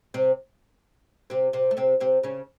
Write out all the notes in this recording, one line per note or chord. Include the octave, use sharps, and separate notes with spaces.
C3 C4
C3 C4
C3 C4
A3
C3 C4
C3 C4
C#3 C#4